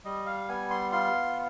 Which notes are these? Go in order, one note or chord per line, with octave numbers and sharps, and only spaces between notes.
G3 D#5
F5
B3 G#5
C6
F4 C6